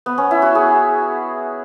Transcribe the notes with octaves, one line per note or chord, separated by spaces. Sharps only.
B3
C#4
E4
F#4
G#4